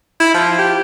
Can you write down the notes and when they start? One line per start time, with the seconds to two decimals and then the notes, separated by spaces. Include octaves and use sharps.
0.20 E4
0.34 F3
0.58 G4